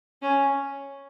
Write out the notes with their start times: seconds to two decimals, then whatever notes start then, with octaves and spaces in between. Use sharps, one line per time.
0.22 C#4